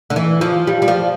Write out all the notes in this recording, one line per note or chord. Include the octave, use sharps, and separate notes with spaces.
D3
E3
F3
G3
G3
F3